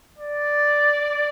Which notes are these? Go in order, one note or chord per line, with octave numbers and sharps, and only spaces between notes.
D5